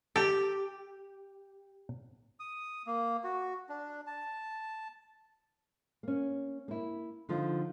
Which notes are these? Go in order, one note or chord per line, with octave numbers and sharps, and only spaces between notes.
G4 A4 A5
D#6
A#3
F#4
D4
A5
A#3 C#4
A#3 E4
D3 F3 D#4 F4